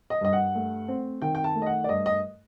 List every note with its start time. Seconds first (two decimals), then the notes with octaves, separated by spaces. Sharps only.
0.10 D#5
0.21 G2 D#5
0.33 F#5
0.55 A3
0.88 C4
1.22 D#3 G5
1.35 G5
1.44 A5
1.55 A3
1.62 D#5
1.66 F#5
1.84 D5
1.89 G2 D#5
2.06 D#5